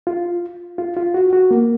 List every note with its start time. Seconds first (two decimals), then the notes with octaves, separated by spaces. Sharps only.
0.07 F4
0.78 F4
0.97 F4
1.14 F#4
1.33 F#4
1.51 A#3